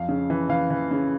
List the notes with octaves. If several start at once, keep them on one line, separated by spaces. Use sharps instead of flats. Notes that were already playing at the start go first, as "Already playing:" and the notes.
Already playing: F2 F5
C#3
E3
E3 F5
E3
C#3